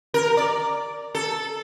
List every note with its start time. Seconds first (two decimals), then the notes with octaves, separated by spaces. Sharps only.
0.14 A#4
0.37 D5
1.15 A4